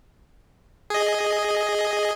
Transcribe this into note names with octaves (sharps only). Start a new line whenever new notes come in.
G#4 D#5